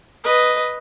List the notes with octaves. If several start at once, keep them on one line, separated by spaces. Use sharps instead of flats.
B4 D#5